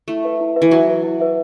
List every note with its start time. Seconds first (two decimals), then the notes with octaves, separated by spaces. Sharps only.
0.08 A3 E4
0.25 B4 E5
0.41 E4
0.56 B4 E5
0.62 E3
0.71 F#3 E4
0.87 B4 E5
1.03 E4
1.20 B4 E5